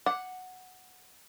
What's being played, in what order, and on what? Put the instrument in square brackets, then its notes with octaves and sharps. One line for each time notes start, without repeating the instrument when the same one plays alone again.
[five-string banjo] F#5 [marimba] D6